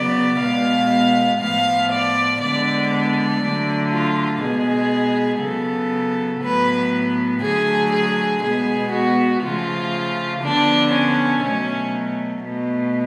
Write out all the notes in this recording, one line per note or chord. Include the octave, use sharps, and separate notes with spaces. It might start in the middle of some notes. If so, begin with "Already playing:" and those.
Already playing: C#3 F#3 B3 D5
B2 G#3 B3 F5
A2 F3 B3 F5
D5
D3 G#3 B3 D5
D5
D3 F#3 A3
F4
B2 G#3 B3 G#4
C#3 F#3 B3 A4
A2 F#3 B3 B4
D3 F#3 A3 G#4
G#4
B2 G#3 B3 G#4
F#4
C#3 F3 A3 F4
D3 F3 B3 D4
C#4
B2 F#3 A3 C#4
B2 A3